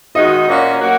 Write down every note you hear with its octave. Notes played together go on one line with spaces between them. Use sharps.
D#3 G#3 D#4 F#4 D#5
A#2 A#3 C#4 F#4
F#3 A#3 F#4